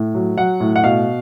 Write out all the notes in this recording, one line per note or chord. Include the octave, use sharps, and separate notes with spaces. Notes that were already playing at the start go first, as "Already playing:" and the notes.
Already playing: A2
F#3
F#3 F#5
A2
F#5
B2 F5